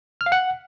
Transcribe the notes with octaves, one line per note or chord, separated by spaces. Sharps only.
F6
F5
F#5